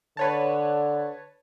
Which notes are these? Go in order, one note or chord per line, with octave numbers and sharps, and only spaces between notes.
D3 B4 C#5 A5